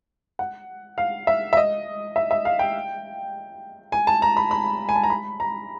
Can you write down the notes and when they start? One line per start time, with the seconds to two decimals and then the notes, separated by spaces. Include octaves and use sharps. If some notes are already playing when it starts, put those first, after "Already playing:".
0.39 F#5
0.98 F5
1.27 E5
1.53 E5
1.57 D#5
2.16 E5
2.31 E5
2.45 F5
2.59 G5
3.92 G#5
4.07 A5
4.22 A#5
4.37 B5
4.51 B5
4.89 G#5
4.96 A5
5.03 A#5
5.10 B5
5.40 A#5